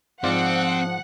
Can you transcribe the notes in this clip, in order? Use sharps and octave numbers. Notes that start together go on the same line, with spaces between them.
G#2 F3 C4 F4 D5 F#5